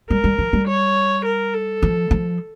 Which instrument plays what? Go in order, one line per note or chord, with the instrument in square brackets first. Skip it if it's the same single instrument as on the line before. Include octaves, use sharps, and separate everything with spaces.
[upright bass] G3 [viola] A#4
[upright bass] G3
F3
G3
[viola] C#5
A#4
A4
[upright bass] F3
F3